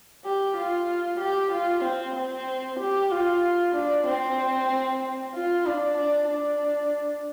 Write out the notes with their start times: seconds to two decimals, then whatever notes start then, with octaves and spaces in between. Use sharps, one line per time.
0.25 G4
0.57 F4
1.20 G4
1.52 F4
1.84 C4
2.15 C4
2.79 G4
3.11 F4
3.75 D4
4.07 C4
5.34 F4
5.66 D4
5.98 D4
6.29 D4